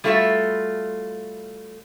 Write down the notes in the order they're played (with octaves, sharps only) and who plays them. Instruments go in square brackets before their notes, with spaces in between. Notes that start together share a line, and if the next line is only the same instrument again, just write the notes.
[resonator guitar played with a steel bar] G3 A3 F4 F#4 A4 E5